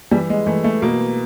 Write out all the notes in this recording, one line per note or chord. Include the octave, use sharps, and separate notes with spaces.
E3 G3
G#3
E3 A3
A3
B2 A#3